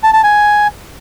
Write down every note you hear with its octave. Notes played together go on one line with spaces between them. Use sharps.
A5
A5
G#5